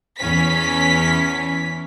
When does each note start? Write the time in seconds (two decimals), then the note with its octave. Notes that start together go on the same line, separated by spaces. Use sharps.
0.18 E2 E3 C#4 B6